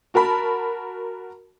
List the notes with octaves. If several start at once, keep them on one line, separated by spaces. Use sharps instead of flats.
F#4 A#4 A5 B5